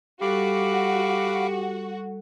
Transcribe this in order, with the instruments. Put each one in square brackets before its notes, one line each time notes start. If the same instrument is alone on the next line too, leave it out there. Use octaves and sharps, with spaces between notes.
[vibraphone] G3 A4 [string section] F#4 [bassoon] G4 [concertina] F5 B5 D6